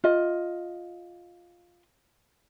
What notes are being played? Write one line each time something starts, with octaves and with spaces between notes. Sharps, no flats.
F4 D#5